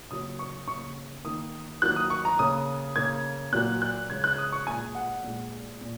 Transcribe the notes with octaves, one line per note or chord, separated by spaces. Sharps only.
C#3 F#3 A#3 D#6
C#6
C#3 C#6
A#3
D#3 A#3 D#6
D#3 F#3 A#3 F#6
D#6
C#6
A#5
C#3 A#3 D#6
C#3 A#3 G#6
A#2 F#3 A#3 F#6
F#6
C#3 G#3 G#6
F#6
D#6
C#6
A#2 G#3 G#5
F#5
A#2 G#3
A#2